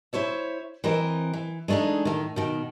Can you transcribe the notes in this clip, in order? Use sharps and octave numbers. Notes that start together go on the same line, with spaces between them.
E4 C5 C#5 E5
E3 C4 A#4 D#5
E3
G#3 A3 D4 D#4 G#4
A2 D#3
B2 D#3